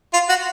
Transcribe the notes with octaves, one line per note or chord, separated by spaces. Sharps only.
F4
F#4